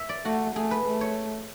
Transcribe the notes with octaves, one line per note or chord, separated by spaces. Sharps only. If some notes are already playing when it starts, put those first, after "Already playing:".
Already playing: E5
D5
A3 F#4
A3 G#4
B4
A3
C#5